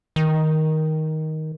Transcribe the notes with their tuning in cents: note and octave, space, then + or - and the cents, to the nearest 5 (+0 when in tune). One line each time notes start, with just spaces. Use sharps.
D#3 +10